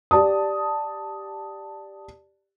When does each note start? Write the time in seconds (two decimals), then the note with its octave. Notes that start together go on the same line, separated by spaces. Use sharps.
0.11 G4 D5 A5 D#6